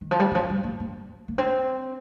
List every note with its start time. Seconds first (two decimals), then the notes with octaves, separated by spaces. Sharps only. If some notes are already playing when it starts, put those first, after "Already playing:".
0.01 D#3
0.11 F3
0.19 G3
0.31 D#3
0.35 F3
0.44 G#3
0.49 G3
0.64 A#3
0.80 A#3
1.28 A#3
1.38 C4